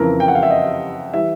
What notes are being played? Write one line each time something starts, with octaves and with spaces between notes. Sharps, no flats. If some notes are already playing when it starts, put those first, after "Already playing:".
Already playing: F2 C#3 E3 A#4
G5
F#5
F5
E5
D#5
E3 G3 E5